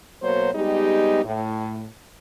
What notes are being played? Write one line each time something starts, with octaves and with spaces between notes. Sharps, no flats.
B2 F#3 A#3 C5 C#5
G3 G#3 B3 D#4 G4
A2